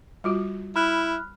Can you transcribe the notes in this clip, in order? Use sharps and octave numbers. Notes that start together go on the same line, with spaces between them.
G3 F4 F#4
E4 B5 F6 F#6